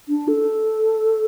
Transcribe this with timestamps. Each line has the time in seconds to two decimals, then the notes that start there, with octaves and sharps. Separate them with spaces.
0.09 D4
0.28 A4